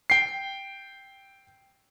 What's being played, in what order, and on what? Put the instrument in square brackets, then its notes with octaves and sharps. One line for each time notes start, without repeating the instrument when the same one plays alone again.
[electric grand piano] G5 C7